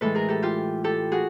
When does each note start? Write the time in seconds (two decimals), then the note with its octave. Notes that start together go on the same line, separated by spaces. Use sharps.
0.01 A2 E3 G#3 A4 B4
0.15 G#4 A#4
0.28 G4 A4
0.42 F4 G4
0.84 G4 A4
1.12 F#4 G#4